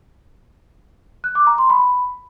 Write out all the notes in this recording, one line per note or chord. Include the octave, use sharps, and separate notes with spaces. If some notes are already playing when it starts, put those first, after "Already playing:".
F#6
D6
A#5
C6
B5